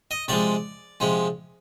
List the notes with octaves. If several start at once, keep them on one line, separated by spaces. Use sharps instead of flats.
D#5
C3 F3 G#3 D5
C3 F3 G#3